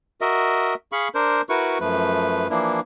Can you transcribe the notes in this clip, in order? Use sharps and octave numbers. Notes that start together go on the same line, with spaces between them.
F#4 A#4 D#5 E5
G#4 F5 B5 C#6
D4 A#4 C5
E4 F#4 A#4 B4 C#6
F#2 F3 A3 B4
E3 F3 A#3 D4 E4